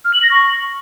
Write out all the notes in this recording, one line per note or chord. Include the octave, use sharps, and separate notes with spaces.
F6
F#7
A#6
C#6